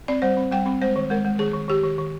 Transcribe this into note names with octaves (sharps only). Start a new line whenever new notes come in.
C4 D5
G3 C5
C4
G3 G5
C4
G#3 C5
D#3
G#3 A#4
G#3
D#3 G#4
D#3
D#3 G4
D#3
D#3